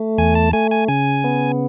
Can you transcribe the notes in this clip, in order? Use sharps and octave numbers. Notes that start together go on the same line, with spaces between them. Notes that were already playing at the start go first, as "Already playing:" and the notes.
Already playing: A3
E2 G#5
A5
A3 G#5
G#5
C#3 G#5
B3